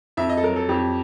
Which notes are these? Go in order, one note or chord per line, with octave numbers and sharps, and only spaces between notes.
F2 E5
D#5
A4
F#3 A#4
A4
F2 G4